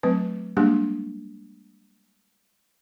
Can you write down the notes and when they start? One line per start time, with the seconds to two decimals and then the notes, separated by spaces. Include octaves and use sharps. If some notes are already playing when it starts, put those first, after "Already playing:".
0.03 F#3 A3 C4 B4
0.57 G3 G#3 A#3 D4 G4 G#4